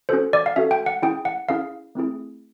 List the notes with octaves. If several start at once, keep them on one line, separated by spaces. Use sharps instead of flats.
C#4 F#4 A4 C5
D5
F5
C#4 F#4 A4 E5
G5
F#5
C#4 E4 G#4 G5
F#5
C#4 E4 G#4 F5
A3 C4 E4 G#4